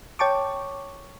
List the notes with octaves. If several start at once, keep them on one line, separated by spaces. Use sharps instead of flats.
C#5 G5 A5 C#6 D6